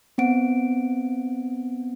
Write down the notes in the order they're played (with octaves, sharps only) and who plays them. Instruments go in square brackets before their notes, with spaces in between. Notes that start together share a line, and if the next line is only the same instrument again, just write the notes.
[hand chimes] B3 C4 F#5 D7